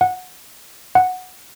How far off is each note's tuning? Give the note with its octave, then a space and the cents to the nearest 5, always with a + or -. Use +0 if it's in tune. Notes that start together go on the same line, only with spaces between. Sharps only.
F#5 -15
F#5 -5